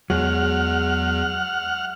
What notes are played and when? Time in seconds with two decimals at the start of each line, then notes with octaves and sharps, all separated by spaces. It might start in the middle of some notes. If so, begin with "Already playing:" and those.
0.10 E2 F#3 G#3 F#5 F6